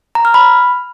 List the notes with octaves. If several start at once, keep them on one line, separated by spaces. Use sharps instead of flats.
A#5
F6
B5